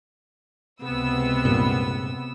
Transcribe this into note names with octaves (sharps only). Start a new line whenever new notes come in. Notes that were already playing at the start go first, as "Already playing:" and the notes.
C#2 C3 B3 E6
G2 A#2